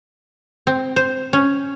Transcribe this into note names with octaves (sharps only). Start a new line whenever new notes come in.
C4
C5
C#4